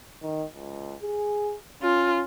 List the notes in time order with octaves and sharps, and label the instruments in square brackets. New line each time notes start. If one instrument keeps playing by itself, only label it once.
[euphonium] D#3
C#2
G#4
[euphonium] C#4 [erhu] F4